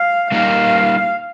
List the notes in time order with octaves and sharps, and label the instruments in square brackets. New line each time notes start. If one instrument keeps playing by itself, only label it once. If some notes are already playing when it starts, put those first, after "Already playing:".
Already playing: [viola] F5
[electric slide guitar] G3 A#3 D#4 G4 A#4 [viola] F5